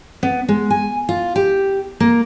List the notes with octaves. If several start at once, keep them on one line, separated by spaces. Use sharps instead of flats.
B3
G#3
G#5
F4
G4
A#3